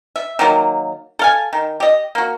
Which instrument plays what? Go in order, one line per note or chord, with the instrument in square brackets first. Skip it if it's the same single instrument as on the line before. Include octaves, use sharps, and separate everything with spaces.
[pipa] E5
D#3 F#3 A#3
A4 F5 G#5
D#3
G4 D#5
A#3 F#4